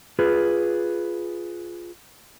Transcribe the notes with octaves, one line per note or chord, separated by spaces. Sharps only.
F4 G#4 B4